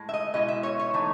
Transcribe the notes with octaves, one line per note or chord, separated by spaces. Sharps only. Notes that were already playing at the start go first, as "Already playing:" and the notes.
Already playing: A2 G#3
E5
D#5
B2 G#3 B3 E4 D#5
E5
C#5
C#5
E3 A3 D#4